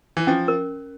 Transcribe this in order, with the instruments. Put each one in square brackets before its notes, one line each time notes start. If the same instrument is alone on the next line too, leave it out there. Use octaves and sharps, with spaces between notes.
[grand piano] E3
[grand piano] F3 [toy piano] C#4
[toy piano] A#4